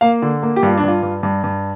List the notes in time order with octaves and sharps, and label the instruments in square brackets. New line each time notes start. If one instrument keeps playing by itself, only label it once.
[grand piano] A#3 F5
D3
A#3
G4
G2 F4
D4
G2 F4
G2
G2
G2